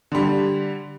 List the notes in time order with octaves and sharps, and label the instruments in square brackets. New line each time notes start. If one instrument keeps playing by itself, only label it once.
[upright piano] D3 G3